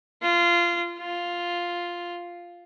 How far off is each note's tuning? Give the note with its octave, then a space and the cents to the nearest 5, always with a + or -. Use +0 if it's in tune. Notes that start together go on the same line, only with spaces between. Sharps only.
F4 -20
F4 +0